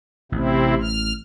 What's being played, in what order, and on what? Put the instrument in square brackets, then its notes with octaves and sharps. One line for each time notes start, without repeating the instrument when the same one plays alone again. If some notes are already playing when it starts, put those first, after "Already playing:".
[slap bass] A1 [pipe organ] C3 C4 E4
[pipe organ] F6